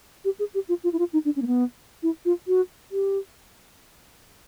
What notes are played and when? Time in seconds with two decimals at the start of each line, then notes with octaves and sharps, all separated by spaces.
0.25 G4
0.39 G#4
0.54 G4
0.69 F4
0.84 F4
0.93 E4
0.99 F4
1.13 D#4
1.25 D4
1.36 C#4
1.42 A#3
1.47 B3
2.03 E4
2.25 F4
2.47 F#4
2.92 G4